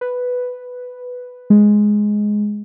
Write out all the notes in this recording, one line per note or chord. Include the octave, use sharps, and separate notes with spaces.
B4
G#3